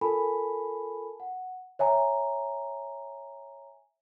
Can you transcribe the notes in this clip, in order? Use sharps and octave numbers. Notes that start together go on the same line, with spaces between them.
F4 A4 A#4 G#5 A5 B5
F#5
C#5 E5 G#5 A#5